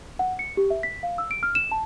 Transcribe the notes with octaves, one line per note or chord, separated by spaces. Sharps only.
F#5
C#7
G4
E5
B6
F5
E6
D7
F6
E7
A5